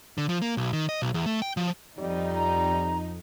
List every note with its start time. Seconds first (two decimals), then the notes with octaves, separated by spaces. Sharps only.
0.18 D3
0.29 F3
0.42 A#3
0.57 B1
0.73 D#3
0.89 D#5
1.02 B1
1.14 E2
1.26 A3
1.42 G5
1.57 F3
1.99 F2 G3 D#4
2.35 A#5